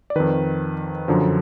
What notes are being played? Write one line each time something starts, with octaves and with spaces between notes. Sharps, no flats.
D5
F2 D#3 B4
F#2 D3 F3